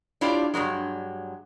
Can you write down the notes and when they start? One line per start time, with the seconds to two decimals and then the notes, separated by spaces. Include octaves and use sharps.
0.21 D4 E4 F4 G4 C#5 D5
0.54 G2 C#3 F#3 G#3